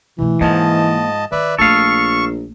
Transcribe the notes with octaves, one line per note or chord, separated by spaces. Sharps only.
B2 E3 A3
G#2 F3 A#3 D#5 A5
D#3 B4 D5 E5
A#1 A3 A#3 A4 F5 C#6